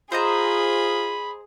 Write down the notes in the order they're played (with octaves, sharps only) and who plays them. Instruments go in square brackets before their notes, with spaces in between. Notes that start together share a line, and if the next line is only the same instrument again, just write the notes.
[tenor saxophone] F4 [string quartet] G#4 [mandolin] C5 D#5 A#5 [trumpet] B5